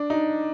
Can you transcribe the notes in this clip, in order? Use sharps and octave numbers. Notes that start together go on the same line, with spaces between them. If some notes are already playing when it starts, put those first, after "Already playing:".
Already playing: D4
D#4